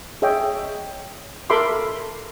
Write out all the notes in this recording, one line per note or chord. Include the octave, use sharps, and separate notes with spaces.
G#4 C#5 D#5 E5 G5
A4 A#4 E5 B5 C6 D6